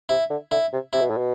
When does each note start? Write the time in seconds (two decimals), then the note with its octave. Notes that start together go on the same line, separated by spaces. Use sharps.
0.09 C3 E4
0.30 D3
0.51 D3 E4
0.73 C3
0.93 C3 E4
1.01 B2
1.10 A2
1.18 B2